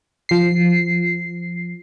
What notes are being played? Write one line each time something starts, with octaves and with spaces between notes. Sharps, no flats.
F3 C7